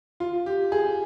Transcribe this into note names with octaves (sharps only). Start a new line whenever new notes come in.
F4
G4
G#4